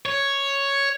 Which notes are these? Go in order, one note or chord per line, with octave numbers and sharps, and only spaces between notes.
C#5